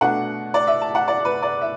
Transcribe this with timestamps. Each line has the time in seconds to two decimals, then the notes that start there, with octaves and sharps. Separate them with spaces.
0.01 B2 A3 D4 F#5
0.54 D5
0.67 E5
0.82 A5
0.95 F#5
1.08 D5
1.25 B4
1.42 D5
1.61 E5